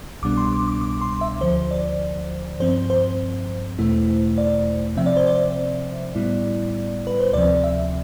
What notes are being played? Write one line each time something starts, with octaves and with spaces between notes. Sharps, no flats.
C2 B2 G3 B3 D4 D6
C6
D6
D6
D6
C6
E5
D2 D3 F3 C5
D5
G2 F3 C4 C5
C5
E2 B2 A3 E4
D5
C3 F3 C4 E5
D5
C5
D5
A2 G3 B3 E4
B4
C5
D2 C3 F3 C4 D5
E5